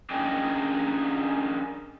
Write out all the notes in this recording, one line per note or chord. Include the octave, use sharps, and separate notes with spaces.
C#4 D4 G#4 A#4 D#5 G5